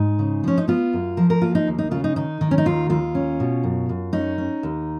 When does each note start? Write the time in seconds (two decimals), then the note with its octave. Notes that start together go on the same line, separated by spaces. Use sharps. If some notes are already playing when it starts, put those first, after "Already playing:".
Already playing: G#2 D#4
0.19 C#3
0.44 F3 C#4
0.58 D#4
0.68 B3 F4
0.93 F#2
1.17 F3 A#4
1.30 A#4
1.42 A#3 F4
1.55 D#4
1.67 D#2
1.79 D#4
1.91 C#3 F4
2.04 D#4
2.16 D#3 D#4
2.41 D#3
2.51 C#4
2.58 D#4
2.65 D#2 F4
2.89 D#2 F4
3.15 C#4
3.40 B2
3.63 F#2
3.89 F#2
4.13 C#4 D#4
4.38 C#4
4.63 D#2